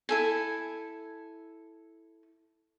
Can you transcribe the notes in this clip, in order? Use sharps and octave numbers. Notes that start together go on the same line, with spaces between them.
E4 A4 G#5